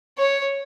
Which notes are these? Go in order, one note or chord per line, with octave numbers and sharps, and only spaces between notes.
C#5